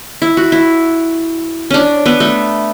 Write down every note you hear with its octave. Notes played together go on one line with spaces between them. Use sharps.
E4
F#4
E4
C#4 D4
B3
A3